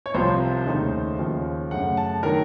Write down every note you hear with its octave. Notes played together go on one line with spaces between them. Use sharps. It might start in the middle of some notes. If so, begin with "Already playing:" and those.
C#5
C2 C3 F3 C5
D#2 C#3 A3 D#4
D#2 C#3 F3 F5
F#2 C#3 A3 F#5
A5
D#3 F#3 A#4